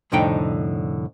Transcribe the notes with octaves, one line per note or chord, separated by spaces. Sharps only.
C2 F2 A2 D3 D#4 G5